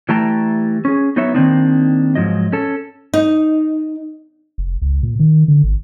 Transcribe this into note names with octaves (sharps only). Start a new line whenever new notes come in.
E3 G3 A3 G5 A5 A#5
C#4 G#4
F#3 B3 D#4 F#4 C#5 E5
D#3 G3 A#3 C4 D4 D#4
G#2 D#3 F3 F#3 D#5
C#4 A4
D#4
F1
C#2
A#2
D#3
D3
G#1